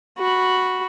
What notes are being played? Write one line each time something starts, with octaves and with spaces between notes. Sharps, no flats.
F#4 B5